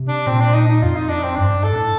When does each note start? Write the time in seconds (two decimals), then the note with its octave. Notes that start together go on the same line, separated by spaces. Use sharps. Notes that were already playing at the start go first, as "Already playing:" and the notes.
Already playing: C3
0.08 D4
0.27 A#2 C4
0.41 D4
0.54 D#4
0.68 D#4
0.82 F2 F4
0.96 D#4
1.09 D4
1.24 C4
1.36 G2 D4
1.55 G2
1.64 A4
1.73 A2